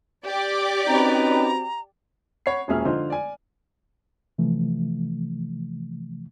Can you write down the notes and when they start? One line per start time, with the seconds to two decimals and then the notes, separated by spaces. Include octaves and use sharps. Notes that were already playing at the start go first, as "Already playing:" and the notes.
0.25 G4 D5 D6
0.87 C4 C#4 D#4 F#4 B4 A#5
2.46 C#5 F#5 B5 C7
2.68 E1 A#2 C#4 G#4 E5 F6
2.85 D3 F3 D#4 F4 C5
3.10 D5 G#5
4.38 C3 E3 F3 A3